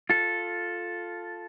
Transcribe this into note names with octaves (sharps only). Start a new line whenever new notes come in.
F4 A4